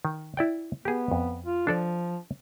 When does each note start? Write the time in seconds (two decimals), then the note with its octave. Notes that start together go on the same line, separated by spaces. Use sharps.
0.05 D#3
0.37 E4 D5 G5
0.85 B3 G4 G#4
1.12 F2
1.46 F4
1.67 F3 D4 A4 D5